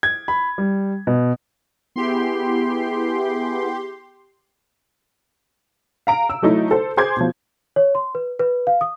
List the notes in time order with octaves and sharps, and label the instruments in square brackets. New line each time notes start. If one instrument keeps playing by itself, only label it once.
[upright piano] G#6
B5
G3
B2
[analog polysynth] B3 E4 G#4 [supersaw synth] G4 C6
[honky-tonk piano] F5 A#5 D7
E6
F#3 A3 D#4 E4
A4 C5
G#4 C5 C6 D6 G6 G#6
B2 F3
[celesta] C#5
C6
B4
B4
F5
D#6